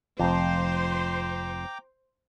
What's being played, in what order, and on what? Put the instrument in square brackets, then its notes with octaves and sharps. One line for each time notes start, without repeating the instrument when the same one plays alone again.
[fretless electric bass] F1 F3 [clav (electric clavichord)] F2 [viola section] C5 C6 [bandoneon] G5 A#5 D6